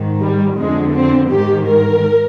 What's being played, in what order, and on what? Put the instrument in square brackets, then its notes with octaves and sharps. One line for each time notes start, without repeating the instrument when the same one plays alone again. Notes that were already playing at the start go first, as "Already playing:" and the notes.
Already playing: [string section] G#2 D#3
G3
F2 D3 G#3
C4
G#2 D#3 G4
A#4